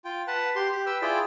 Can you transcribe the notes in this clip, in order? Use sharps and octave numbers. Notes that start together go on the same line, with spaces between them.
F4 G5
B4 F#5 A5
G4 C6
G4
B4 G5 E6
E4 F4 G#4 D5 G5